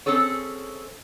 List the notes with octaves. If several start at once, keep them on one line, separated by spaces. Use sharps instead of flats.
C4 C#4 G#4 A4 C#5